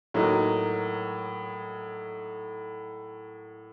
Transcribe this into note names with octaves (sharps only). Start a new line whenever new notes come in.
A2 F#3 A#3 D#4